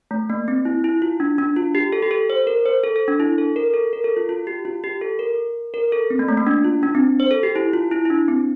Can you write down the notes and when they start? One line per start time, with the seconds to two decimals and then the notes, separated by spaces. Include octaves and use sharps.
0.11 A3
0.30 A#3
0.48 C4
0.65 E4
0.84 E4
1.02 F4
1.20 D4
1.38 D4
1.56 F4
1.75 G4
1.92 A4
2.02 G4
2.11 A4
2.30 C5
2.47 A#4
2.66 C5
2.83 A4
2.96 A4
3.08 D4
3.20 E4
3.38 A4
3.56 A#4
3.74 A4
3.93 A#4
4.04 A4
4.17 F4
4.29 F4
4.47 G4
4.65 F4
4.84 G4
5.01 A4
5.19 A#4
5.74 A#4
5.92 A4
6.10 C4
6.19 A#3
6.28 A3
6.37 A#3
6.47 D4
6.64 F4
6.83 D4
6.95 C4
7.20 C5
7.31 A4
7.43 G4
7.56 E4
7.73 F4
7.91 E4
8.05 E4
8.10 D4
8.28 C4